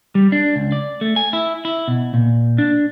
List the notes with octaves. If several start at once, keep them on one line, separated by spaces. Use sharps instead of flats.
G3
D4
C#2
D5
A3
G#5
E4
E4
B2
A#2
D4